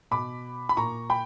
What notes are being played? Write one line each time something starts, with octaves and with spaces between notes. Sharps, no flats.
B2 B5 D6
B5
A#2 A#5 C#6
G5 B5